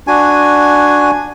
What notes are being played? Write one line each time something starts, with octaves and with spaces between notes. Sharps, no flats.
D4 F#4 G#5